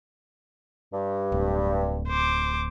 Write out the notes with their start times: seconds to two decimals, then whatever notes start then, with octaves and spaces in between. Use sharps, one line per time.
0.93 G2
1.32 D1
2.08 C5 D6